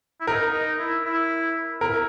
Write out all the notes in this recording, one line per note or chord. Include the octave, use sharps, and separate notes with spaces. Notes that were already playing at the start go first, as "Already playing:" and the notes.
E4
D#4 A#4
D#4
E4
E4
E4 A#4